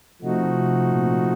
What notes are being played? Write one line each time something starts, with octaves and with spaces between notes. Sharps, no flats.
C3 F3 A3 D#4 F#4
A#2
C3